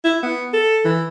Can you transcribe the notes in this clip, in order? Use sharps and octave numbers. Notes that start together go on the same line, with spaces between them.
E4
B3
A4
E3